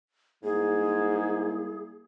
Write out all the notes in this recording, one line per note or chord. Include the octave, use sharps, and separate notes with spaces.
G#2 G3 A#3 E4 G#4